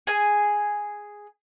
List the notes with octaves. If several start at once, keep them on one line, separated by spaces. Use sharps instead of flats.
G#4 G#5